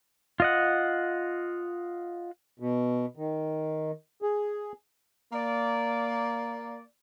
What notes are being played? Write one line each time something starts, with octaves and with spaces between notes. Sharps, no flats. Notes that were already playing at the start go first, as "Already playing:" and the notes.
F4 D#5 F#5
B2
D#3
G#4
A#3 D5